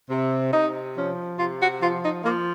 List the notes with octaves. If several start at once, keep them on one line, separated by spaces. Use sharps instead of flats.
C3
C3 D#4
F3 C#4
C3 F4
F#4
F3 F4
D#4
F3 A#3